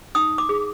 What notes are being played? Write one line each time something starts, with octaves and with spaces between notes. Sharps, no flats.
D#4 D#6
D6
G#4